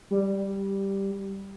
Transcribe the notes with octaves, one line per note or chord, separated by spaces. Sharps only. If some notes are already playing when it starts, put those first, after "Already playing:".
G3